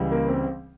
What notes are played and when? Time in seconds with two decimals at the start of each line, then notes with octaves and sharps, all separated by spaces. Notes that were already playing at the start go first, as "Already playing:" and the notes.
Already playing: C#2 C#3 E3 G3
0.11 A#3
0.28 C4